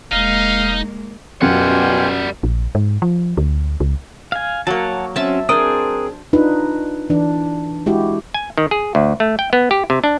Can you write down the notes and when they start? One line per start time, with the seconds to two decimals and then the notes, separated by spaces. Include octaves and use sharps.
0.12 E1 G#3 A#3 D#4 F5
1.42 F#2 B2 G3 F4 G4 F#5 G#5
2.43 A#1
2.75 G#2
3.02 F3
3.37 D2
3.80 C#2
4.32 F5 G#5
4.67 F#3 A#3 C#5 F#5 A5
5.16 F#3 C4 C#4 E5 A5
5.49 C4 D4 G#4 A#4 C5 D#6
6.33 D4 D#4 F4 B4
7.10 E3 D4
7.86 G#3 E4 F#4 G4
8.34 G#5
8.58 D#3
8.71 G#4
8.95 D2
9.20 A3
9.39 G5
9.53 B3
9.71 G4
9.90 C3
10.04 D4